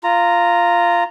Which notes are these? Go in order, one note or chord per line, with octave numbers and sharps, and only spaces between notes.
F4 A#5